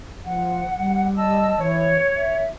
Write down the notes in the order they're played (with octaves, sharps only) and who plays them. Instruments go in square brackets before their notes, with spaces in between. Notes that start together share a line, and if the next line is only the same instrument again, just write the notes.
[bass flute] F3 [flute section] F#5
[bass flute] G3
[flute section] D#5 A5 E6
[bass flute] E3 [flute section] C#5
[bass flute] E5